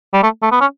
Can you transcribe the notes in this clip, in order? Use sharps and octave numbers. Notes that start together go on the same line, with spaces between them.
G3
A3
A3
B3
C#4